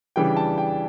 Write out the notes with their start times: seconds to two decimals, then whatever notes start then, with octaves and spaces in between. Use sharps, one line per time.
0.16 C#3 E3 G3 D4 G5
0.37 A5
0.57 G5